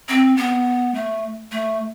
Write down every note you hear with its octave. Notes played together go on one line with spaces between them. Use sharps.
C4
B3
A3
A3